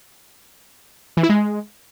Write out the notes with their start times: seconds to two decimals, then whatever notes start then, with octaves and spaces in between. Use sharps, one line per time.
1.17 E3
1.23 E4
1.29 G#3